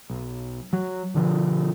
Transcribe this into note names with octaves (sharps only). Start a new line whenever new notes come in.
B1
F#3
B2 D3 F3